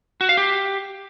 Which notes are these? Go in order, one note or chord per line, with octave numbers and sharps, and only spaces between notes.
F#4
F5
G4